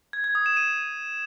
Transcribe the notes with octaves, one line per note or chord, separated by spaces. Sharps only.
G#6
G#6
D#6
E7
D#7